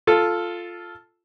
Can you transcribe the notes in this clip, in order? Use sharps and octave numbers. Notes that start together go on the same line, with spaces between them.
F4 A4